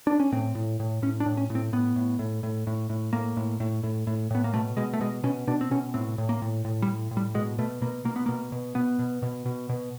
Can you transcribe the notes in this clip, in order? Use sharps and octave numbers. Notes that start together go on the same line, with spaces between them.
D4
C#4
A2 C4
A2
A2
A2 C#4
D4
A2
C#4
A2
C4
A2 B3
A2
A2
A2
A2
A2
A2 A#3
A2
A2
A2
A2
A2 B3
A#3
B2 A3
B2 G#3
A3
B2 G#3
B2 C#4
B2 D4
C4
B2 C#4
A2 C4
A2
A#3
A2
A2
G3
A2
A2
G3
B2 G#3
B2 A3
B2 A#3
B2 A#3
B3
B2 A#3
B2
B2 B3
B2
B2
B2
B2